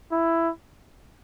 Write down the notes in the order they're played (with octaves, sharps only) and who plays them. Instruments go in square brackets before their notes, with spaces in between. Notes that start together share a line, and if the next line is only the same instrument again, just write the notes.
[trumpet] E4